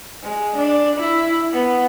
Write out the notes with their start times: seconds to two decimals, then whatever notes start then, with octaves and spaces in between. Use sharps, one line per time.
0.23 G#3
0.56 D4
0.96 E4
1.53 B3